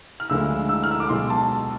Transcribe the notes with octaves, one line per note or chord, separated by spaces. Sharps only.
F6
D2 D3 F3 G#3 E6
E6
F6
E6
D6
B1 B2 G#3 C6
A5